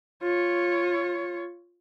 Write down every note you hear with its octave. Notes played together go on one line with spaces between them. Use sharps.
F4 C#5